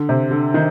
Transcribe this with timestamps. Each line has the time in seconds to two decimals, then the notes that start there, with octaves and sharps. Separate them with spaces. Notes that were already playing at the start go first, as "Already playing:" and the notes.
Already playing: D3
0.09 C3
0.31 D3
0.54 D#3